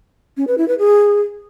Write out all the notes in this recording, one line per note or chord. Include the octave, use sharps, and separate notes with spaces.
C#4
B4
E4
B4
G#4